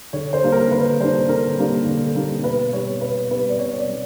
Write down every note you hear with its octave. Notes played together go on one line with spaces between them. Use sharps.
D3 C#5
C5
G3 A#3 D4
A#4
D3 B4
G3 A#3 D4 C5
D3 A#4
G3 A#3 D4
D3
G3 A#3 D4
B2 B4
G3 B3 C#5
B2 B4
G3 B3 B4
D5
B2 C#5
D5
G3 B3